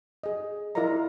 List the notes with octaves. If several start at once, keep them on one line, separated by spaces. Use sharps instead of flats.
G#4 D#5
E4 F4 A#4 D5 D#5 A#5